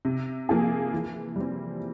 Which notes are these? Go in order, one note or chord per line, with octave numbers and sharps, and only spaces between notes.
C3
F3 A#3 F4 G#4
E3
G3 C4